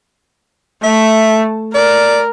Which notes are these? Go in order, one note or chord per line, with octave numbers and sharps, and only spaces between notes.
A3 E5
A#4 D5